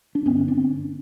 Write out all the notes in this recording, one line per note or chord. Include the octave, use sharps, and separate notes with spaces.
D4
G2 D3 B3 C#4
C4 D4